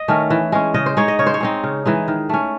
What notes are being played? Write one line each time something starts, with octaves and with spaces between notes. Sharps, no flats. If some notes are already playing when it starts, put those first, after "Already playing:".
Already playing: D#5
D#3 A3 C#4
E3
G#3 C#4
C#3 D#5
C5
G#3 D#4 C#5
D#5
C#3 C#5
C5
C#5
G#3 C4 D#4
C#3
E3 G#3 D#4
D#3
A3 C#4